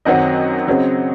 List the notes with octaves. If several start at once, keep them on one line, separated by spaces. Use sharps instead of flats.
F#2 D#3 F#3 C4 D#5 F#5
C#3 F#3 C4